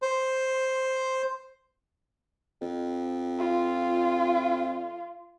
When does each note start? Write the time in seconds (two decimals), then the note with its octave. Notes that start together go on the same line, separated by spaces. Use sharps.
0.02 C5
2.61 F2
3.39 F4